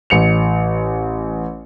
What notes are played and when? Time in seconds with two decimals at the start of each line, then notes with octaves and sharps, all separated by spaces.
0.10 A1 C#7 F7